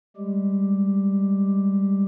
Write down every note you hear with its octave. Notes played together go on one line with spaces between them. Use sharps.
G3 G#3 G4